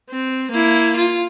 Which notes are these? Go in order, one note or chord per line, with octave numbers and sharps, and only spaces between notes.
C4
A#3 E4
F4